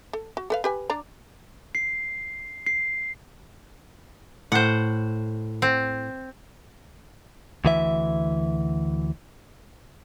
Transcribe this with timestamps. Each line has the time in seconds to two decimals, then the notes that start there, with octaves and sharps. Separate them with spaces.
0.13 A4
0.37 F#4
0.50 A4 B4 F5
0.64 G4 B4 G#5
0.90 D4 D5 A#5
1.75 C7
2.67 C7
4.52 A2 C5 F#5
5.62 C4
7.65 D2 E3 E5